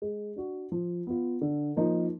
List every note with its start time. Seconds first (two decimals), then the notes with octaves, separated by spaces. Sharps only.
0.02 G#3
0.36 D4 F#4
0.72 F3
1.07 B3 F4
1.41 D3
1.76 F3 A#3 D#4